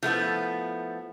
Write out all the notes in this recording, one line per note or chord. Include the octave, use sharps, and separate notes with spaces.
F3 A3 B3 E4